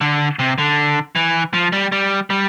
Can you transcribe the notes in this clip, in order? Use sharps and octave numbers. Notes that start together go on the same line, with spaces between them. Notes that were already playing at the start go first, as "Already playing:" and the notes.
D3
C3
D3
E3
F3
G3
G3
G3